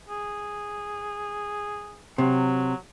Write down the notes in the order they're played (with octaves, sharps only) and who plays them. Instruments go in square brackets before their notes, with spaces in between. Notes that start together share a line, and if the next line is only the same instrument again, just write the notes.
[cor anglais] G#4
[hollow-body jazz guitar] C3 [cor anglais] F#3